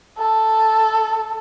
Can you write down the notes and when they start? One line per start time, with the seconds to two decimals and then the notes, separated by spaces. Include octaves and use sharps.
0.18 A4